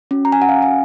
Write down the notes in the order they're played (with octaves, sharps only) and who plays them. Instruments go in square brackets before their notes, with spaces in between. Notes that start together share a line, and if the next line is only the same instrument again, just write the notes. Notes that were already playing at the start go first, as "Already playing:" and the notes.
[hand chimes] C#4 F#4
A#5
G#5
F#5
F5
G#5